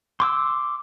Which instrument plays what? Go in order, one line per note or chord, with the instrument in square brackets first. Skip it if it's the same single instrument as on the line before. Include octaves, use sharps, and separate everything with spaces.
[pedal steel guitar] C6 D6 E6